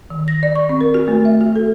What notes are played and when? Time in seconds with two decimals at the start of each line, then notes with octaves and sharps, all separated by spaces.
0.10 D#3
0.28 A#6
0.43 D5
0.55 C#6
0.69 C4
0.81 A#4
0.94 F#4
1.08 A3
1.25 E5
1.41 F#4
1.56 A4